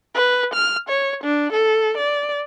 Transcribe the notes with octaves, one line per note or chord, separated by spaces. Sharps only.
B4
F6
C#5
D4
A4
D5